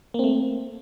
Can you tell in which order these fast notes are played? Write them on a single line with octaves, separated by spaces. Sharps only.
A#3 C4 A3